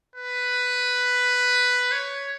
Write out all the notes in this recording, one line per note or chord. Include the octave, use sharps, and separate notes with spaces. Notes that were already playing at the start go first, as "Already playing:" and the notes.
B4
C#5